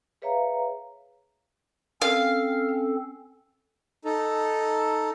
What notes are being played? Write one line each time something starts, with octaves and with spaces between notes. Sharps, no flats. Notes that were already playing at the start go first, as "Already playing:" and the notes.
G#4 B4 C#5 E5 F5 A#5
C4 C#4 A4 F5
D#4 A4